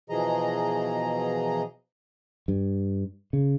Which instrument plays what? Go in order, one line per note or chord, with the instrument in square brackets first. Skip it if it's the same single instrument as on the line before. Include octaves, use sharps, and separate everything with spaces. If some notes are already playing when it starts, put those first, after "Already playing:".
[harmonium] B2 E3 F3 G#4 D#5 A#5
[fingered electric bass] G2
C#3